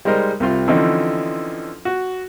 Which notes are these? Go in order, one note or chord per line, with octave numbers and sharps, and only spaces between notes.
G3 G#3 D#4 A#4 C5 D#5
C2 C4 F4 C6
D3 E3 F3 C4 C#4 D#4
F#4